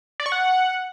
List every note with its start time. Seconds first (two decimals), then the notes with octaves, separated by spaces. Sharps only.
0.20 D5
0.26 C#6
0.32 F#5